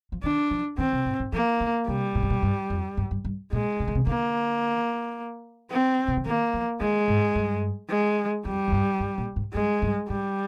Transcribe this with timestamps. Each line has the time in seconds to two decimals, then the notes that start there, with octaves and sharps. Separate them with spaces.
0.12 F3
0.23 D#3 D4
0.51 F3
0.78 D#3 C4
0.93 C3
1.05 G#2
1.20 G#2
1.33 F3 A#3
1.60 D3
1.87 C3 G3
2.15 A#2
2.23 G#2
2.30 A#2
2.42 G2
2.70 F2
2.97 G2
3.11 G2
3.25 G2
3.53 A#2 G#3
3.80 C3
3.87 D3
3.95 C3
4.07 D3 A#3
5.71 C4
6.08 C3
6.17 D3
6.26 D#3 A#3
6.54 F3
6.81 D#3 G#3
7.08 G#2
7.35 G2
7.90 G#3
8.45 F2 G3
8.68 F2
8.72 G2
9.00 G2
9.18 A#2
9.36 G#2
9.54 G2 G#3
9.82 G2
10.09 G#2 G3